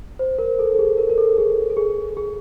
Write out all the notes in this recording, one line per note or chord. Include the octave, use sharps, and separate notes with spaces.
C5
A#4
A4
A4
G#4
A#4
A#4
A4
G#4
A4
G#4
G#4